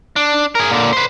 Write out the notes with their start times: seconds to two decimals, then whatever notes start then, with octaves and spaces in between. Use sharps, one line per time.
0.16 D4
0.55 G#4 A#4
0.71 A#2 D3
0.93 B4 C5